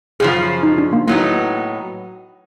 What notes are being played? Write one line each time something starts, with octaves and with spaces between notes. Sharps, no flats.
F#2 C#3 F3 G#4
D#4
D4
A#3
A2 F#3 A#3 B3 D#4